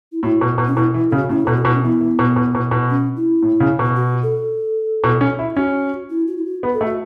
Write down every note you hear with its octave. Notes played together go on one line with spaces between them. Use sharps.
E4
A2 F#4
B2
B2
C#4
B2 E4
E3
C#3 A4
F#4
A2 C#4
B2 A4
F#4
B2 E4
C#4
E3 B3
E3
B2
B2
B2
B2
C#4
E4
A2
C#3
B2
F#4
A4
B2
C#4
E4
C#4 F#4
E4
F#4
E4
F#4
B3
A4
A3
F#4